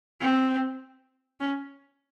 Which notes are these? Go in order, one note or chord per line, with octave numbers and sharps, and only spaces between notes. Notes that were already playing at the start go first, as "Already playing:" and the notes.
C4
C#4